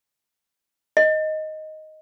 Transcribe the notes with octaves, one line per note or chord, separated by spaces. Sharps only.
D#5